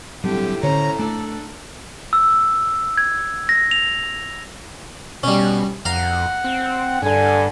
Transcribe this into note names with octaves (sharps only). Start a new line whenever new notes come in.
A2 D3 F#3 G3 C4 G4
D3 C#4 C5 C#5 A#5
A3 D4 A4
E6
G#6
A#6
F7
B2 G3 C#4
F2 F5 F#5 A#5
C4
G2 D3 G#5